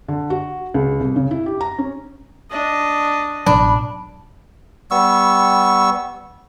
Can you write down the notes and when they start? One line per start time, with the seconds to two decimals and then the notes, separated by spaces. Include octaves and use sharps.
0.08 D3
0.30 F#4
0.74 C#2
1.00 C2
1.16 C#3
1.31 E4
1.46 G4
1.61 A#5
1.78 C#4
2.51 D4 D#5
3.46 A1 B2 F#3 D4 B5
4.91 G3 B3 C#6 E6